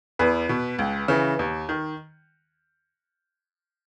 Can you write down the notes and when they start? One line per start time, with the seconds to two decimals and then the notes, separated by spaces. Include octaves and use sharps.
0.19 E2 B4
0.49 B2
0.79 C#2
1.08 C#3 E3
1.39 D#2
1.69 D#3